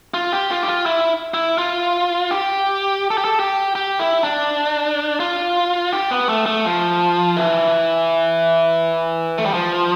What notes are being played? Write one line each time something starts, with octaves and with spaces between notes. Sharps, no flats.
F4
G4
F4
G4
F4
E4
E4
F4
G4
A4
G4
A4
G4
G4
E4
D4
F4
G4
B3
A3
A3
F3
E3
A3
G3
F3